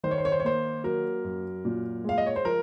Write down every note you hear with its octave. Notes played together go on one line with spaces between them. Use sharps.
D#3 C5
C#5
C5
C#5
C5
C#5
A#3 C5
F#3 A#4
F#2
A#2
G#3 F5
D#5
C#5
C5
F3 A#4